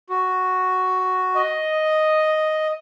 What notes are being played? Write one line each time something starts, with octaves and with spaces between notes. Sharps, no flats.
F#4
D#5